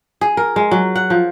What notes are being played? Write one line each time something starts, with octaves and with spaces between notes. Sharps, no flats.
G#4
A#4
G#3
F#3
F#5
F3